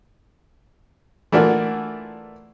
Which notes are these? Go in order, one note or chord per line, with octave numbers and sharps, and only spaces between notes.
E3 A3 A#3 D4 F4 F#4